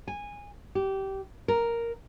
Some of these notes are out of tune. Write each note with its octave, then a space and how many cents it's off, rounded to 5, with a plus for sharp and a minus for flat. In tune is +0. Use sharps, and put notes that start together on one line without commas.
G#5 -15
G4 -20
A#4 +0